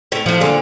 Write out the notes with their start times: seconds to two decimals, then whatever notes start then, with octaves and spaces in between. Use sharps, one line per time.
0.12 A2
0.26 A2 F3
0.41 A#2 D3